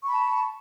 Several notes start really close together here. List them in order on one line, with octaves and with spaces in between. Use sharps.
C#6 B5 A5